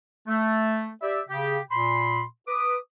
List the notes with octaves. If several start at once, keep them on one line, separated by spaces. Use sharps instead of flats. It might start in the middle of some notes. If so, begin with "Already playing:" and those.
A3
G4 D5 E5
C#3 G4
A#2 B5 C6
B4 D6 D#6